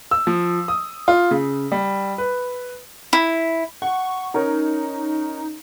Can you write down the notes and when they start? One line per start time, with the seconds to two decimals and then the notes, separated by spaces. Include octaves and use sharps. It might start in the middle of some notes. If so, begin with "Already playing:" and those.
0.11 E6
0.27 F3
0.68 D#6
1.08 F4
1.31 C#3
1.72 G3
2.18 B4
3.13 E4
3.82 F#5 C#6
4.34 C#4 D#4 A#4 C#5